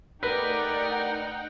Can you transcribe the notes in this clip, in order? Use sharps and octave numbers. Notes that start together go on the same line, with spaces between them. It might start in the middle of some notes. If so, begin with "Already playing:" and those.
A3 D#4 G4 A#4 B4 D5 F#5 G5